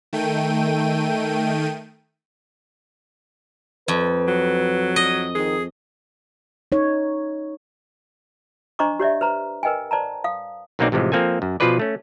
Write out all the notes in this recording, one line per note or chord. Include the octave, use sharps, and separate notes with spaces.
D#3 A3 G5 D#7
F2 B4
F#3
D#5
D#3 G#4
D#4 C#5
D4 C5 D#5 A#5 C#6 D6
G4 C#5 D5 E5
B4 C5 A#5
A#4 B4 D#5 G5 G#5
C5 D5 A5 A#5
F5 D#6
B1 F#3 A#3 C4 D#4 D5
A1 C3 E3 F3 G#3
F3 A#3 C4 A4 G#5
F#2
B2 F3 F4 G#4 B4 D5
A3 C#4